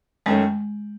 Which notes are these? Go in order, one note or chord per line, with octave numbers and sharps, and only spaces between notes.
F#2 D#3 G#3 A3 C#4